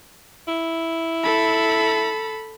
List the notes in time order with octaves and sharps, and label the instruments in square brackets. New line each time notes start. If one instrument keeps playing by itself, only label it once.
[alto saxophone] E4
[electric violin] A4 B5